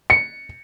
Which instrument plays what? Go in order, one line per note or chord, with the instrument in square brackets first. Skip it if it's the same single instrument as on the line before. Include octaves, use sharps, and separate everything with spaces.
[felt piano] C#7